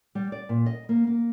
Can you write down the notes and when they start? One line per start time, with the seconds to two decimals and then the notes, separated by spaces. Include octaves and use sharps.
0.15 G3
0.32 D5
0.49 A#2
0.66 D#5
0.89 A#3
1.07 A#3